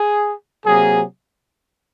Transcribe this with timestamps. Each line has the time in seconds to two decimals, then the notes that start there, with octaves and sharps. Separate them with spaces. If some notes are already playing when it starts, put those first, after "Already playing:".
Already playing: G#4
0.65 C3 F#3 A#3 G#4